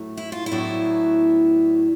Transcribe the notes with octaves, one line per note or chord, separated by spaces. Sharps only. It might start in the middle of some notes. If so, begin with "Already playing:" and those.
Already playing: A2 F#3 A3
E4
F4
E4
A2 F#3 B3 D4